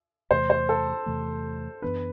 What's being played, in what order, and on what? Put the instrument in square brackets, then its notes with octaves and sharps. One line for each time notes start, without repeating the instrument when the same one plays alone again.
[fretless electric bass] E2 C3 E3 A3 [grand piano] C5
[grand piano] C5
A4
[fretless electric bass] E2 C3 E3 A3
[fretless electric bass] F#2 E3 B3 D4 [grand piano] B4